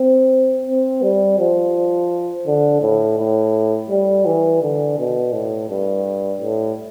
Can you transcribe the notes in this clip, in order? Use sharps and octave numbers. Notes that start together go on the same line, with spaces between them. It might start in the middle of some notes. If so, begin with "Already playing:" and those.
Already playing: C4
C4
G3
F3
D3
A2
A2
G3
E3
D3
B2
A2
G2
A2